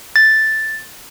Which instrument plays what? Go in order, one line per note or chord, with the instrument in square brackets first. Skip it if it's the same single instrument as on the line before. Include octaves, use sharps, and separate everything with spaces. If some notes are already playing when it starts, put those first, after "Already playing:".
[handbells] A6